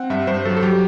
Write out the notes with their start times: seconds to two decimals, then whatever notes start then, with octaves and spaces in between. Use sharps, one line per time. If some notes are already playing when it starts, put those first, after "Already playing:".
Already playing: C4 F#5
0.10 G2 E5
0.27 G2 C5
0.45 F#3 A4
0.57 A4
0.63 F#3 G4